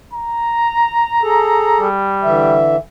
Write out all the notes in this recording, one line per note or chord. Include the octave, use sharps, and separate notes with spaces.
A#5
G#4 A4
G3
D3 E3 E5